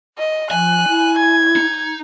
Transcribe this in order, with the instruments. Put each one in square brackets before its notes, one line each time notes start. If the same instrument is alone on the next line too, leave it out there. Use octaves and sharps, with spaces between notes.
[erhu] D#5
[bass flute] F3 [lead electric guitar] G#5 [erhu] F#6
[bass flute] E4
[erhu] G#6
[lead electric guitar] D#4